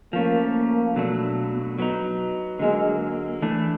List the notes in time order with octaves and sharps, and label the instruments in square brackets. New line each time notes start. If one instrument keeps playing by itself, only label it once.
[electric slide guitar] F3 A3 C#4 [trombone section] A#3
[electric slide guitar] B2 F#3 A3 D4
F#3 B3 D#4
[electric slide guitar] D3 F#3 A#3 [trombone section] G#3
[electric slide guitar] E3 A3 D4